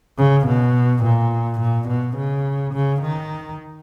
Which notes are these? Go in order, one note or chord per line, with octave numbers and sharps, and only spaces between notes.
C#3
B2
A#2
A#2
B2
C#3
C#3
D#3